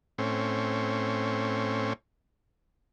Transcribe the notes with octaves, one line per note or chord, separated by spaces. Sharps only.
A2 C4 C#4